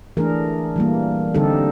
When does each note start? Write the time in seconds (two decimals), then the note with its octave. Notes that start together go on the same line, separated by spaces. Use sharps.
0.17 E3 A3 D4 G#4 A#4
0.76 E3 G3 A#3
1.34 D3 G3 C4 D#4 G4 A4